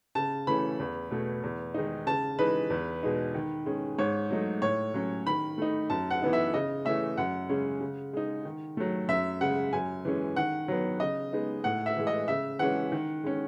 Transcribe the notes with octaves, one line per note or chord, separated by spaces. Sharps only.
C#3 A5
E3 A3 C#4 B5
E2
B2 A3
E2
D#3 G#3 D#4
C#3 A5
E3 G#3 D#4 B4
E2
B2 G#3 D#4
D#3
G#3 C#4
G#2 C#5
F#3 A3 D#4
A2 C#5
F#3 C#4
D#3 B5
A3 D#4
F#2 A5
F#5
E3 B3 D#4
E5
C#3 D#5
E3 A3 C#4 E5
F#2 F#5
C#3 G#3 C#4
C#3
G#3 D#4
D#3
F#3 A3
F#2 E5
C#3 G#3 F#5
F#2 G#5
E3 G#3 C#4
D#3 F#5
F#3 B3
C#3 D#5
G#3 B3 D#4
A2 F#5
E5
E3 G#3
D#5
C#3 E5
E3 G#3 C#4 F#5
D#3
G#3 C#4